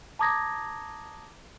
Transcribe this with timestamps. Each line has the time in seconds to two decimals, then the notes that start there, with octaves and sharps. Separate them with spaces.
0.19 A5 A#5 D6 D#6 G#6 A#6